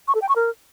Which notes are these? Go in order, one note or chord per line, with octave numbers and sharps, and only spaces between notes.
C#6
A4
G5
C#6
A#4